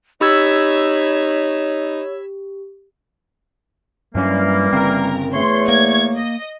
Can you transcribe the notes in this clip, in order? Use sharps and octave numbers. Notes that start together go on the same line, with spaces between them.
D#4 G4 C#5 B5 E6 G#6
G2 E3 F#3 G3 A#3 C#4
G1 C#3 C4 A#4
E2 A3 C#5 C6
A#3 G#6
D#5